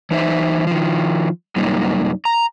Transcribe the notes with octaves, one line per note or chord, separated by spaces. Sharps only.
E3 D#4 C5 E5
D#3 F3
F#2 C3 G3 A#3 D#4
A#5